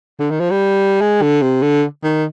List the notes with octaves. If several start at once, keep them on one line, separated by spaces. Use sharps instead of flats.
D3
D#3
F3
G3
G#3
D3
C3
D3
D#3